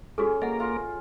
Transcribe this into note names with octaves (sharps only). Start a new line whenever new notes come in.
C#4 F#4 G#4 A4
A#3 A#4 D#5 F#5
F4